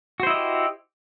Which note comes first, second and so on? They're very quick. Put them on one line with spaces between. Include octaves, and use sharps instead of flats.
F#4 C5 E4 D#5 G4